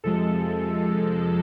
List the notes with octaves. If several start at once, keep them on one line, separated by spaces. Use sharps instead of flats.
F2 C3 F3 G#3 A4